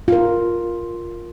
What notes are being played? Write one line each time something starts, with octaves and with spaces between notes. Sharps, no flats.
F4 A#4